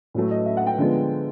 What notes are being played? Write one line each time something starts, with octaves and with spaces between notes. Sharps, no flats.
A2 F#3 A3
D#5
E5
F#5
G5
D3 F3 G#3 B3